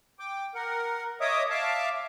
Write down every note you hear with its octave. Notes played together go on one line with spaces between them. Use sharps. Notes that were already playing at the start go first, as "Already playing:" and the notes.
G5 D6
A#4 F#5
C#5 D#5 E5 D6 D#6
E5 F5 A5 D6